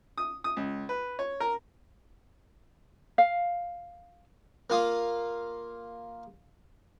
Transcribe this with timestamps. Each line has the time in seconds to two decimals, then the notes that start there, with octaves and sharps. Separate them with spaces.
0.18 D#6
0.44 D#6
0.57 C#2
0.89 B4
1.19 C#5
1.40 A#4
3.18 F5
4.70 A#3 F4 D#6